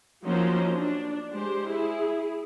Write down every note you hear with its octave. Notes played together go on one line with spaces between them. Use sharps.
F3 F#3 A#3 C#4 D#4 C5
D4
G#3 G4 C5
E4 G#4